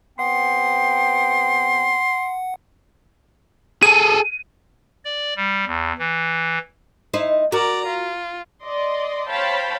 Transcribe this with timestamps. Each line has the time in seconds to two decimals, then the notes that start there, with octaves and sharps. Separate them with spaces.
0.19 C3 B3 F#5 G5 C6
3.83 G#4 A4 D#7
5.05 D5
5.36 G3
5.67 E2
5.99 E3
7.14 D#4 E4 C5
7.52 F#4 A#4 D5 A#5
7.86 F4
8.62 D5 D#5 C6
9.28 C5 C#5 F5 G5 A5 B5